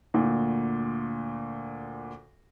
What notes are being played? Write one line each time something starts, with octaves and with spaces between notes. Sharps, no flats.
D2 A#2